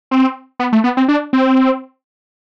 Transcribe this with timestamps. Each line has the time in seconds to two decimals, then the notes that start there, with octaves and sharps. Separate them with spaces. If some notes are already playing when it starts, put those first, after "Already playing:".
0.11 C4
0.59 B3
0.73 A3
0.84 B3
0.97 C4
1.08 D4
1.33 C4